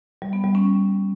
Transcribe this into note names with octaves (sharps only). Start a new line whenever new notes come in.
G3
B3
G3
C#4